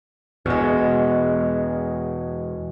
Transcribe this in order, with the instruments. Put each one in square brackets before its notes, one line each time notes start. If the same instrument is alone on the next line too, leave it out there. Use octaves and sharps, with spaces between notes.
[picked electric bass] E2 B2 [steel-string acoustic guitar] G#3 F#4